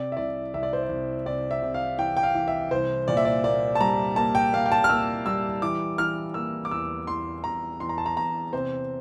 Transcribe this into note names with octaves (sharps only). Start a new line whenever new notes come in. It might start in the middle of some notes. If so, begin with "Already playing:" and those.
Already playing: C3 D5
E5
C2 D5
C2 E5
D5
C5
D5
C2
C3 D5
E5
C3
F5
E3 G5
G5
F5
E3
E5
C2 C5
A#2 D5
E5
D5
A#3 D5
A5
G3 A#5
A#3 A5
G5
A#3 F5
G5
A5
F6
A#3 E6
G3 E6
E3 D6
E3 F6
A#3 E6
D6
E2 E6
E2 C6
E2 A#5
E2 C6
A#5
A5
A#5
E2 A#5
C3 C5